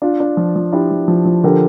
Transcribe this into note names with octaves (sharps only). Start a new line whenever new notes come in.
D4 F4
D4
F3
F3
D4 E4 G4
F3
F3
F3
D3 G4 A#4